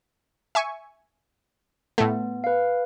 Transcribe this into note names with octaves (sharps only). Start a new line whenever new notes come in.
E5 G#5 C#6
A2 A3 B3
B4 F5